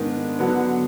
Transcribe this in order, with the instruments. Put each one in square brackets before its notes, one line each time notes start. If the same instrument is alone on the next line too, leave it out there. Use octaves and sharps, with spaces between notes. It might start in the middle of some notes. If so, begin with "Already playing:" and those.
Already playing: [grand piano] G#2 D#3 G#3 B3 D4
D3 F#3 B3